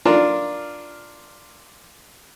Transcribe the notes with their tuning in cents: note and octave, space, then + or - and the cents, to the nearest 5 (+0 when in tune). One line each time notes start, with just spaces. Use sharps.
D4 +0 F4 +0 A#4 +0